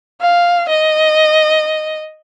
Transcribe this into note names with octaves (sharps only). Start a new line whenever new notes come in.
F5
D#5